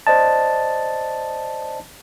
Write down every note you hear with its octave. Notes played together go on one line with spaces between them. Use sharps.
C5 D5 D#5 A5